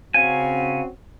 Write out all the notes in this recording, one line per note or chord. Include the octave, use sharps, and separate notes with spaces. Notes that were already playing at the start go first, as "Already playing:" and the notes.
C#3 C4 C#4 F#4 F5 G#5